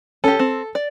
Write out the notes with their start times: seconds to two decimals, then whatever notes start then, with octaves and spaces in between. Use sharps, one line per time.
0.24 C#4 G4 A4
0.39 C4
0.75 D5